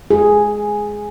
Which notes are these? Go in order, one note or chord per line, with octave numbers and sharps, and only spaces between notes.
G#4